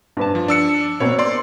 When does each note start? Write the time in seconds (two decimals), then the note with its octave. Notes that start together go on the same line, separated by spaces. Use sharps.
0.17 G2 B4 A5
0.35 F3
0.48 D4 E6 C#7
1.00 B2 A#3 C4 C#5
1.19 D5 C6